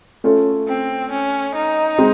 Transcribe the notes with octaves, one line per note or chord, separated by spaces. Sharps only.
A3 C#4 F4 A4
C4
C#4
D#4
G#3 C4